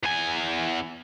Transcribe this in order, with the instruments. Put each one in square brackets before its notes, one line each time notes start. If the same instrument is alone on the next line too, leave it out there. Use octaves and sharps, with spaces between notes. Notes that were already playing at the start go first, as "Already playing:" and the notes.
[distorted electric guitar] E2 G#5